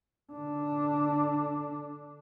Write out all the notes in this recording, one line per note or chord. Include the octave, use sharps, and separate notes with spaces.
D3 D4